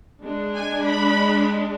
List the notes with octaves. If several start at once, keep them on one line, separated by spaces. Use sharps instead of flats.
G#3 D4
G#5
B5